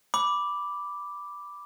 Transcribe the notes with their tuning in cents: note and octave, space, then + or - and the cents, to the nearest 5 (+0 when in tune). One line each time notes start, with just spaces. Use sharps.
B5 +0 D6 +0